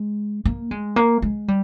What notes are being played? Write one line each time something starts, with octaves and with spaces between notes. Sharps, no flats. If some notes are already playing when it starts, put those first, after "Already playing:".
Already playing: G#3
A#3
G#3
A#3
G#3
G3